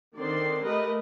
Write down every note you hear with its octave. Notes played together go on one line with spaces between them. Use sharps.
D3 D#3 C4 D5 C6
A3 G4 A#4 B4 D#5